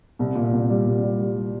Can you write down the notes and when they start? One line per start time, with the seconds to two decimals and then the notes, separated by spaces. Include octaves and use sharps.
0.19 C2
0.35 A#2
0.52 C2
0.70 G3
0.87 C2
1.03 G3
1.20 G3
1.37 G3